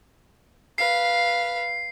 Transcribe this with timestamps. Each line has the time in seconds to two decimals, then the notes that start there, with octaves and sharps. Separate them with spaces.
0.78 B4 F5 C7